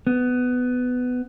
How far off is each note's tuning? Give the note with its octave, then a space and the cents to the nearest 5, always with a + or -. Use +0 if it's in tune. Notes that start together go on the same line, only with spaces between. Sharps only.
B3 +15